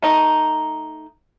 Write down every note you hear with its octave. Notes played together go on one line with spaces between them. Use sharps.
A3 D#4